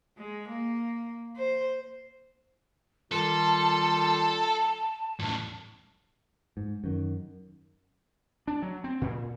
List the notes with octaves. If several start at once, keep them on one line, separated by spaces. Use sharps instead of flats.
G#3
A#3
C5
D#3 G3 F4 A4 A5
E2 A2
G#2
F#2 D#3
D4
F#3
C4
A#2